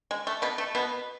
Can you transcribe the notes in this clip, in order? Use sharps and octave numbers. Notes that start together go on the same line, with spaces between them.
G#3
A3
B2 B3
A3
B2 B3